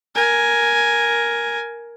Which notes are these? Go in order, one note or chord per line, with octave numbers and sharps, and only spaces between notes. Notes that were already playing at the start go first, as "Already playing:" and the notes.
A#4 G#5